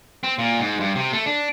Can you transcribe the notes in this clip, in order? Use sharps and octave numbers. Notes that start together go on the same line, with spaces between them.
C4
A#2
G#2
G2
C3
A3
D4